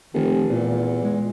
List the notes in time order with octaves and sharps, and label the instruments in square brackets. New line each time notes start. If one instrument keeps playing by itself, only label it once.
[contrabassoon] F1 [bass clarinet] D#3
[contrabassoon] E2 [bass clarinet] A#2
[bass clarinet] G#3